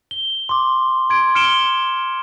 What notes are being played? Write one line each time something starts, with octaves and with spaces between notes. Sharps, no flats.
G7
C6 D6
C6 G#6 D7
F6 C#7 D7 E7 G7